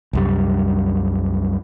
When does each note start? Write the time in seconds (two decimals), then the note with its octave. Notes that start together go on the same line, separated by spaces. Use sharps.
0.13 C2 F#2 G3